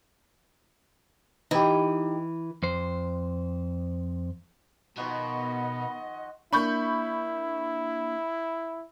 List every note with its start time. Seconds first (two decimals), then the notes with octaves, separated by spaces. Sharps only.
1.51 E3 D#4 G4
2.63 F2 C5
4.97 B2 D#3 F3 B3 F#4 D#5
6.53 A#3 D4 E4 B5 C#6 G6